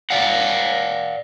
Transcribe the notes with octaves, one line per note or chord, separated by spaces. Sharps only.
D5 F5 F#5